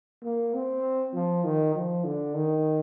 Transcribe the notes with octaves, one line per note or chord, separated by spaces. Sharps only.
A#3
C4
F3
D#3
F3
D3
D#3